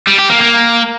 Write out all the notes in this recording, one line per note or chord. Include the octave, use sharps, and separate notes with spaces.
G3
G4
A#3
A#3